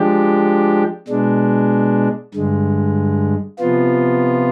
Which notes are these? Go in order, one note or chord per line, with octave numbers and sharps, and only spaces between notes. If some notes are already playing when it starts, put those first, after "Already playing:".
Already playing: F3 G#3 D4 G4
B2 G#3 D4
G2 D3 G#3
C3 F3 B3 F4